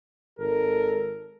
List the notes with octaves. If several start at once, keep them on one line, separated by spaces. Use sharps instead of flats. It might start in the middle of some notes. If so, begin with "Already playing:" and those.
G#1 A4 A#4